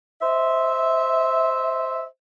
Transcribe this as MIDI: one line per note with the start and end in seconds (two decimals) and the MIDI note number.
0.22 2.04 72
0.22 2.04 75
0.22 2.04 76